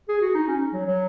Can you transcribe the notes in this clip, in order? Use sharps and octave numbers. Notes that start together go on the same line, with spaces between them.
G#4
F#4
D#4
C#4
F#3
F#3